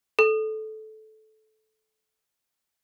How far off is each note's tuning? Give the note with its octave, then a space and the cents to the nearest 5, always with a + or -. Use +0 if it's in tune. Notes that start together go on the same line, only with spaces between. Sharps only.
A4 -15